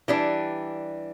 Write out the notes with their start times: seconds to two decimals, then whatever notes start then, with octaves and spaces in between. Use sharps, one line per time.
0.08 E3 G3 D4